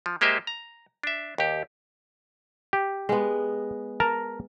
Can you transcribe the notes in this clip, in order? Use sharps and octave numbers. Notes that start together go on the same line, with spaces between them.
F3
G#3 A#3 G4 C5 D#5 E5
A#5
D4 E5
D#2 G4
G4
G#3 B3
A#4 A5 A#5